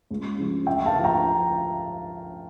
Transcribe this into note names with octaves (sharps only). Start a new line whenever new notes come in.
C#2
C#3 F3
D2 E5 G5
F5 A5
D3 F3
G5 A#5